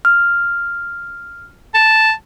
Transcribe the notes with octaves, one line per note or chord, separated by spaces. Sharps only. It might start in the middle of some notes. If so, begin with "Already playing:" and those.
F6
A5